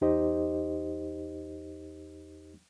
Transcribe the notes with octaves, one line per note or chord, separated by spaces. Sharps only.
E2 D#4 G4 C5 D#5